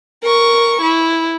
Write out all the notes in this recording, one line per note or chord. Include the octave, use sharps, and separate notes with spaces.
A#4 C#6
E4